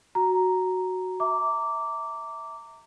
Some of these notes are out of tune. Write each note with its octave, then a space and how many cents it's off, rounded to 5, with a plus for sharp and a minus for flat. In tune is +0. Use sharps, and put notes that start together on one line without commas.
F#4 +0 A#5 +0
E5 -20 A#5 -25 D6 -10